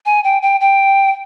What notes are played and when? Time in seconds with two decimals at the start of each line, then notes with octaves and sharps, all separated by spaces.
0.06 G#5
0.24 G5
0.42 G5
0.61 G5